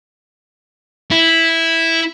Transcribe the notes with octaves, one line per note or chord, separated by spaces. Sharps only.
E4